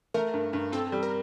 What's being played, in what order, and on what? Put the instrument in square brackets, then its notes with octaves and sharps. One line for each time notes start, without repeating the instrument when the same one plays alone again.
[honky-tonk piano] A3 [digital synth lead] A#4
[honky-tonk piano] G2
G2
[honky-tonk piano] C4 [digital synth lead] A4
[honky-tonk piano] G3
[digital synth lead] A#4